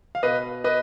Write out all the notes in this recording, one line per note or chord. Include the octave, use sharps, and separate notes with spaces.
F5
B2 B4 D#5
B4 D#5